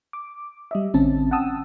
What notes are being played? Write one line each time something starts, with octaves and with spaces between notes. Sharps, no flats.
D6
G3 D#5 E5
A1 D3 C4 C#4 A5
F#5 G5 A5 D#6 E6